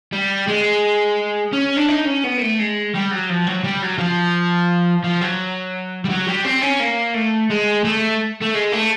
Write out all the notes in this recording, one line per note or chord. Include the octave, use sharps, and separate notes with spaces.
G3
G#3
C#4
D4
D#4
C#4
B3
A#3
A3
G#3
G3
F#3
F3
F#3
G3
F#3
F3
F3
F#3
G3
F#3
G3
C4
C#4
A#3
A3
G#3
A3
A3
G#3
A3